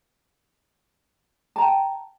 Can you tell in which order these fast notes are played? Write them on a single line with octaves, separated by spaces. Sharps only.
A5 A#5 G5